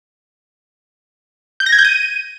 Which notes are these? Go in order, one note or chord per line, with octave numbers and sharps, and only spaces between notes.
G6
A#6
G#6
G6
D#7